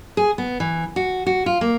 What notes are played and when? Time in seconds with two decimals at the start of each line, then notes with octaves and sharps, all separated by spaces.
0.17 G#4
0.38 B3
0.60 E3
0.96 F#4
1.26 F#4
1.46 F4
1.61 A#3